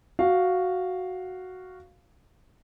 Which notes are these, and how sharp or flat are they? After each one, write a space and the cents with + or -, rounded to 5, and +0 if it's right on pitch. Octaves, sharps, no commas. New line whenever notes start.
F#4 +0 F5 +0